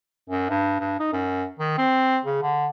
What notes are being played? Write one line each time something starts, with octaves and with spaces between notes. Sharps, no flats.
F#2
G2
G2
D#4
F#2
D#3
C4
C#3
D3